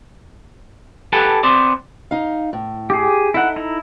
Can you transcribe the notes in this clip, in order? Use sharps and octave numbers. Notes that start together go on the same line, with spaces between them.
G4 A4 B4 F#5 G#5 A5
B3 C4 C5 D5
D#4 F5
A2
G4 G#4
D#4 E4 A4 F#5
E4 A#5